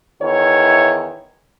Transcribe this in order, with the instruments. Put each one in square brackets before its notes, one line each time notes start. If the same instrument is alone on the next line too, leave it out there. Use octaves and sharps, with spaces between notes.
[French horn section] E2 D#3 E4 C#5